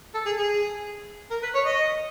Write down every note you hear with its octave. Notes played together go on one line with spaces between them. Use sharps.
A4
G#4
G#4
A#4
B4
C#5
D#5